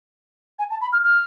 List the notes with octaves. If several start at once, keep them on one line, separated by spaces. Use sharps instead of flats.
G#5
A5
B5
F6
F6